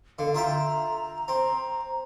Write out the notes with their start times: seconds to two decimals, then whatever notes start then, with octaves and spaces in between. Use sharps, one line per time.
0.19 D3 F5
0.35 F4 E5 G5 A#5
1.28 C4